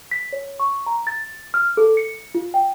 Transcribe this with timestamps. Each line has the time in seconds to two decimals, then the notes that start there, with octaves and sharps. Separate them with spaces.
0.11 B6
0.33 C#5
0.59 C#6
0.86 A#5
1.07 A6
1.54 F6
1.77 A4
1.97 C#7
2.35 F4
2.54 G5